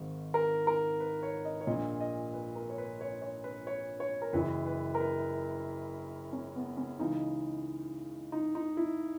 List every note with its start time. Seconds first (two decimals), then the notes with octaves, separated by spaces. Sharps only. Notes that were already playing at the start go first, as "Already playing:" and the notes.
Already playing: G#1 G#2 D#3
0.34 A#4
0.67 A#4
1.00 B4
1.23 C#5
1.45 D#5
1.61 C#5
1.67 A#1 A#2 D#5
2.01 D#5
2.34 B4
2.56 A#4
2.70 C#5
2.78 B4
3.01 C#5
3.22 C#5
3.44 B4
3.67 C#5
4.00 C#5
4.22 A#4
4.33 F#1 F#2 E3 B4
4.66 B4
4.95 A#4
5.00 B4
6.33 C#4
6.55 B3
6.77 C#4
6.99 C#2 C#3 E3 D#4
8.32 D#4
8.55 D#4
8.77 E4